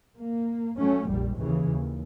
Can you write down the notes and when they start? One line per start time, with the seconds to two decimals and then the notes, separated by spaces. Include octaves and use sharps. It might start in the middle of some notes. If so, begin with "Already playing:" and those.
0.17 A#3
0.78 F#3 A3 C#4
1.08 F1 A#1 G3
1.37 D#2 C#3 E3
1.69 D#2